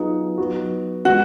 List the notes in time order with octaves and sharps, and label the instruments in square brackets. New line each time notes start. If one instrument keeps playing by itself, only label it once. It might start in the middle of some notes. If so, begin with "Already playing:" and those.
Already playing: [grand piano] F#3 B3 F4 G#4 [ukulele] D#4
[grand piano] F#3 B3 F#4
[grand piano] F3 G#3 B3 [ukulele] F#4